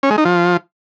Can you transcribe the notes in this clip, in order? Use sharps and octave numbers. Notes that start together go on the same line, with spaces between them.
C#4
G#3
D#4
F3